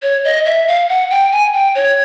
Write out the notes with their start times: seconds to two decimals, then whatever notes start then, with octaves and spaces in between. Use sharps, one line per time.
0.02 C#5
0.24 D#5
0.46 E5
0.68 F5
0.89 F#5
1.10 G5
1.32 G#5
1.53 G5
1.75 C#5